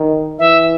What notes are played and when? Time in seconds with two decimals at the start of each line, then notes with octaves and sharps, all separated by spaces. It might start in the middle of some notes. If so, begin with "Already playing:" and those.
Already playing: D#3
0.39 E3 E5